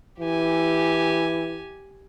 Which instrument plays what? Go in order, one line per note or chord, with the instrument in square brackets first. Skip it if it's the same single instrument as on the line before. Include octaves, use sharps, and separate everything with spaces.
[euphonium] E3 [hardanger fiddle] G4 G#5